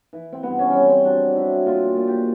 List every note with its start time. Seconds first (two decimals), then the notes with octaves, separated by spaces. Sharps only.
0.13 E3
0.33 C4
0.43 G2 B3
0.59 C#4
0.70 G2 C4 C#4
0.90 C4
1.05 F#3 D4
1.36 F#3 E4
1.66 A#2 F4
1.97 A#2
2.08 G4